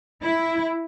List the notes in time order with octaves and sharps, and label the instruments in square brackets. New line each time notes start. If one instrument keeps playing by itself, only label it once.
[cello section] E4